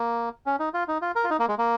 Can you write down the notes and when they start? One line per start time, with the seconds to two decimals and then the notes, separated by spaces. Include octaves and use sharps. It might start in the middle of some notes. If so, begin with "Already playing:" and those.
Already playing: A#3
0.46 C#4
0.59 D#4
0.74 F4
0.88 D#4
1.02 F4
1.15 A#4
1.24 F4
1.30 D#4
1.39 A#3
1.48 G#3
1.58 A#3